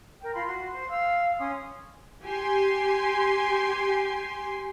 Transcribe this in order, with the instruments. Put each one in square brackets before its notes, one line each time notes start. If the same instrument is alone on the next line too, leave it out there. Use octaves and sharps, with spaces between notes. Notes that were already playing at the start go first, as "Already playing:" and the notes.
[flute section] A#4 G5
F4 B5 C6
F#4 C6
C5 C6
F5 E6
C#4 C6 D#6
[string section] G4 G#5 C6